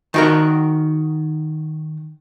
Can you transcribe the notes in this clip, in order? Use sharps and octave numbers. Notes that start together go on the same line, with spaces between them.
D#3 F#4 A#4